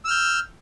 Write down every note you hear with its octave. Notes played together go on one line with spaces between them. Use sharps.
E6 F6 G6